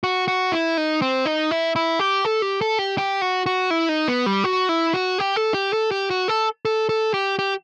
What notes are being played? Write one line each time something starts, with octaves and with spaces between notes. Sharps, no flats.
F#4
F#4
E4
D#4
C4
D#4
E4
E4
G4
A4
G4
A4
G4
G4
F#4
F#4
E4
D#4
B3
G3
F#4
E4
F#4
G4
A4
G4
A4
G4
F#4
A4
A4
A4
G4
G4